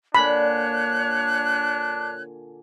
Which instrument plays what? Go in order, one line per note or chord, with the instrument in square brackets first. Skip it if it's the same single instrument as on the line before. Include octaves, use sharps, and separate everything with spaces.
[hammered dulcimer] A#2 D3 G#5 [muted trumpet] D4 [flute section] C#5 F#6 [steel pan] B5